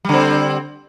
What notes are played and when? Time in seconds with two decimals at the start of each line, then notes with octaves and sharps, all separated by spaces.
0.05 G3
0.09 D3
0.13 C4